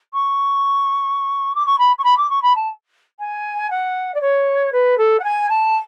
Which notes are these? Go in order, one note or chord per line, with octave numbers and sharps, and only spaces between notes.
C#6
D6
C#6
B5
C#6
B5
D6
C#6
B5
A5
G#5
F#5
D5
C#5
B4
A4
F#5
G#5
A5